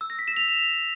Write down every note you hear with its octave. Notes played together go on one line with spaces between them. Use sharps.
E6
A#6
B6
E7
F7